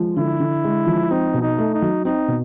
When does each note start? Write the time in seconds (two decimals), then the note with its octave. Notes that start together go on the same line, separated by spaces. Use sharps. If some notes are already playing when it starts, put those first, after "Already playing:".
Already playing: F3 G#3
0.16 D3 E4
0.40 D3
0.64 G#3
0.87 F3
1.11 C4 D#4
1.34 B2
1.42 D#4
1.58 A3
1.74 D#4
1.82 F#3
2.05 C4 D#4
2.28 B2